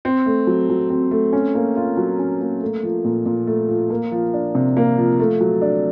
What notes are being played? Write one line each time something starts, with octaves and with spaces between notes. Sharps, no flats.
C4
A3
F#3
F#3
C4
A3
C#4
A#3
F4
F#3
C#4
A#3
A3
F3
A#2
A#2
A3
F3
A#3
F3
D4
C3
A#3
F3
A3
F#3
D4